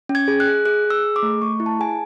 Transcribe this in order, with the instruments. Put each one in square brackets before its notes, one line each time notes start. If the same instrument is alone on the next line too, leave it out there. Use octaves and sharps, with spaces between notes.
[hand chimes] C#4
G#6
G#4
F#6
G#4
G#4 F#6
G#4
E6
G#4
D6
A3
A3 C#6
E4
A5
G#4 G#5